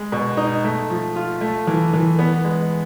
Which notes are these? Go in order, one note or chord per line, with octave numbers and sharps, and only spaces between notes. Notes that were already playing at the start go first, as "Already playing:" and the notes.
Already playing: G#3
B2
D#4
A3
F3
F4
A3
E3
E3
B3
G#3